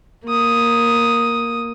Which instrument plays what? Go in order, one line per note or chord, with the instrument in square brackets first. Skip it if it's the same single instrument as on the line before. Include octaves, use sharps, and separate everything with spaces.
[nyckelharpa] A#3 D#6